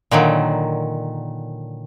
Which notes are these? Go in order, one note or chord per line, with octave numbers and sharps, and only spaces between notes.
A#2 D3 D#3 F#3